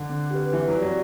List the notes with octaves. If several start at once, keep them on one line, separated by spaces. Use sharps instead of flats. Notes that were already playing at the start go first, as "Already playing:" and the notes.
Already playing: D3
C4
G4 B4
E3 C4
F#3
G4 D5
F#3